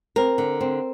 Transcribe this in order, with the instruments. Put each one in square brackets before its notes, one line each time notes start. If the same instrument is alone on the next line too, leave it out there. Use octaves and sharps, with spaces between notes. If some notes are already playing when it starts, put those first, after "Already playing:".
[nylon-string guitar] C4 A#4
D3
C4